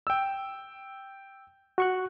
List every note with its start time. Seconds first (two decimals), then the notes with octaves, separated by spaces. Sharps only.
0.07 G5 E6
1.78 F#4 C#6 F#6